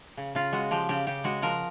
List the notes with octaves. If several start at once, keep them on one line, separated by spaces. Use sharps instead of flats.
C#3
C#3 F4
G#3 F#4
F3 G4
C#3 G4
C#3 G4
G#3 F#4
F3 A#4